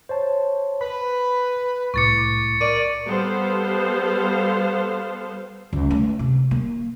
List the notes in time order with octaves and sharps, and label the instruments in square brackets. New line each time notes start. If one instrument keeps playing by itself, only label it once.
[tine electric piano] C5 C#5 A5
[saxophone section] B4 [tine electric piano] B5
[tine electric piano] C2 A2 D6 [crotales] C#6 A6 C#7
[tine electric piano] A#4 C#6 [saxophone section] D5 [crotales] D#7
[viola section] G3 B3 A4 C5 F5
[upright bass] C#2
A3
C3
A#3